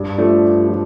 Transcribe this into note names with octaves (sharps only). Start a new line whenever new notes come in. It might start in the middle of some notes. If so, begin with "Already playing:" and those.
Already playing: G2
F3 A3 D4
G2
F3 A3 D4